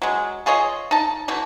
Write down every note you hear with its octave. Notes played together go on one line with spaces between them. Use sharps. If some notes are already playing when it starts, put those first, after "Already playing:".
F#3 G#3
F4 G#4 C#5 D#5
D#4 A5
B2 E3 A3